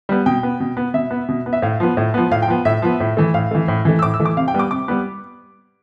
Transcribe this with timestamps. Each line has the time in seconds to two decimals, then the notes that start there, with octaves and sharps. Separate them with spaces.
0.09 G3 B3
0.26 B2 G5
0.43 B3
0.60 B2
0.77 B3
0.94 B2 E5
1.11 B3
1.29 B2
1.46 B3
1.53 E5
1.62 A2 F5
1.80 F3 B3
1.97 A2
2.14 F3 B3
2.31 A2 F5
2.42 G5
2.48 F3 B3
2.65 A2 E5
2.82 F3 B3
3.00 A2
3.17 E3 A3
3.34 A2 F5
3.51 E3 A3
3.68 A2
3.85 E3 A3
3.99 E6
4.02 A2 D6
4.14 E6
4.20 E3 A3
4.25 D6
4.37 C3 F5
4.48 G5
4.54 G3 B3
4.59 D6
4.71 C3 D6
4.88 G3 B3